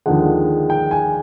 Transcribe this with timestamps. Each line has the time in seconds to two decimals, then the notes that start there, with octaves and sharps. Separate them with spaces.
0.06 D#2 D3 F3 G#3 F#5
0.70 G5
0.91 G#5